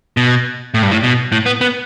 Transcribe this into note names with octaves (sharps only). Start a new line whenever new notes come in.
B2
A2
G2
A2
B2
A2
B3
B3